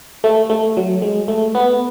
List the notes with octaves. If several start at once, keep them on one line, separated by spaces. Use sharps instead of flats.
A3
A3
F#3
G#3
A3
B3